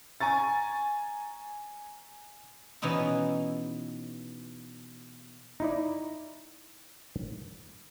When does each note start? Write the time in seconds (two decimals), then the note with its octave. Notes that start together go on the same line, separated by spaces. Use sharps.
0.21 G#5 A#5 C#6 A6
2.82 B2 E3 C#4 D#4 E4
5.60 D#4 E4 D5